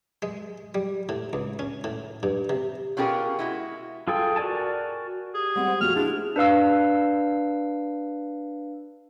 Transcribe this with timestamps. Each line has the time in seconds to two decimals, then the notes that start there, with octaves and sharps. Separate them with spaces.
0.22 G#3
0.75 G3
1.09 A2
1.33 C#2
1.59 C#4
1.84 A2
2.23 G2
2.50 C3
2.97 B2 C#4 F4 G4 G#4 A#4
3.39 G#3 E4 F#4
4.08 F4 G#4 A4 G5
4.36 F#4 A#4 D5 G#5 A5
5.34 G4 G#4
5.56 G3 G#3 C4 F#5
5.67 C5
5.80 F2 A#2 F#4 F6
5.95 D4 E4 F4 G#4
6.36 D4 B4 F5 E6